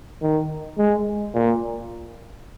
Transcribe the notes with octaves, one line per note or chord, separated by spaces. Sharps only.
D#3
G#3
A#2